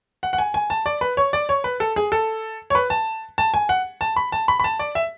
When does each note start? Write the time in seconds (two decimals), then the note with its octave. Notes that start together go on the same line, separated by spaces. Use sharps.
0.23 F#5
0.33 F#5
0.38 G#5
0.54 G#5
0.70 A5
0.86 D5
1.01 B4
1.17 C#5
1.33 D5
1.49 C#5
1.64 B4
1.80 A4
1.96 G#4
2.12 A4
2.70 C#5
2.75 B4
2.90 A5
3.38 A5
3.54 G#5
3.69 F#5
4.01 A5
4.16 B5
4.32 A5
4.48 B5
4.60 B5
4.64 A5
4.79 D5
4.95 E5